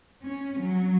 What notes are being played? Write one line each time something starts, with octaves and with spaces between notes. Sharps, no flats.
C#4
F#3